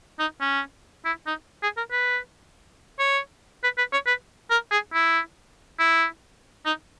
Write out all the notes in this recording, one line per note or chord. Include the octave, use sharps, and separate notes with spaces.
D#4
C#4
E4
D#4
G#4
A#4
B4
C#5
B4
B4
C#5
B4
A#4
G#4
E4
E4
D#4